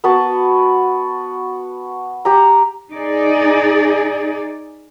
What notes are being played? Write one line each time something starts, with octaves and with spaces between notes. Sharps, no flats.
B3 F#4 B4 A5
G4 A#5
D#4 G#4 D5